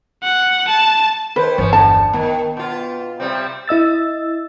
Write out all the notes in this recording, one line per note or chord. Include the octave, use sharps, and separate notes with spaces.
F#5
A5
D#3 B4 C5
G1 E2 F3 C#4
D3 A5
D#3 B3
B2 F4
C3 G3 C4
E4 D#5 E6 A6